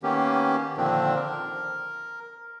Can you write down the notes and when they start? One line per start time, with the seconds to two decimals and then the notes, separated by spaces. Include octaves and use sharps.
0.03 D#3 A#3 B3 C#4 G4
0.77 A#2 D3 D#3 F3 C4 D4
1.15 A#4